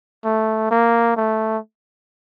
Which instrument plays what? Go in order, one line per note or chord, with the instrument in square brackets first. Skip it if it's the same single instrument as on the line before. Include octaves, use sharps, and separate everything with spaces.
[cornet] A3
A#3
A3